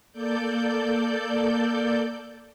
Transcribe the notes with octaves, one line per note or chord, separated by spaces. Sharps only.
A#3 A4 D5 G6